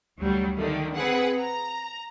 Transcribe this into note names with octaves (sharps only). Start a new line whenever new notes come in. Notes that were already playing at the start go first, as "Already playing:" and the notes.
D2 F#3 G3
D3 D#3 A3
C4 G#4 B4 F#5
A#5